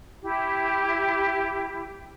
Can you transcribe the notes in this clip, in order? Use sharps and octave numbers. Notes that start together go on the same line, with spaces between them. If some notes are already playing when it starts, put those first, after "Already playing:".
E4 G4